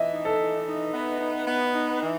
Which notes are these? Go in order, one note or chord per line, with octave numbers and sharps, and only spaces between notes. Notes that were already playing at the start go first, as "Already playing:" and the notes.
Already playing: E3 D#5 E5
D#4
A4
E3
D#4
B3
D#4
B3
D#4
E3